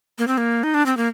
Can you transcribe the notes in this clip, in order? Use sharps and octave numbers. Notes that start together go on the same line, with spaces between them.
A#3
C4
A#3
D#4
D4
C4
A#3